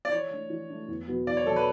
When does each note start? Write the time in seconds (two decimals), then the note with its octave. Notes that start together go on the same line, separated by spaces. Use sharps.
0.05 D5
0.12 E3 C#5
0.31 A3 D4
0.50 E3
0.70 A3 D4
0.88 E2
1.07 B2 F#3 B3 F#4
1.27 E2 D5
1.37 C#5
1.46 B2 F#3 B3 F#4 A4
1.56 B4